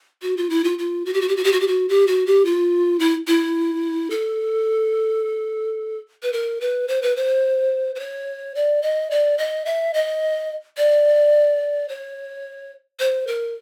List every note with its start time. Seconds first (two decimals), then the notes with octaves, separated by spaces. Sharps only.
0.22 F#4
0.37 F4
0.50 E4
0.64 F4
0.79 F4
1.05 F#4
1.13 G4
1.21 F#4
1.28 G4
1.36 F#4
1.44 G4
1.52 F#4
1.60 G4
1.67 F#4
1.89 G4
2.07 F#4
2.26 G4
2.45 F4
2.99 E4
3.27 E4
4.10 A4
6.23 B4
6.33 A#4
6.61 B4
6.88 C5
7.02 B4
7.16 C5
7.95 C5
7.99 C#5
8.55 D5
8.82 D#5
9.11 D5
9.38 D#5
9.66 E5
9.94 D#5
10.77 D5
11.89 C#5
13.00 C5
13.27 A#4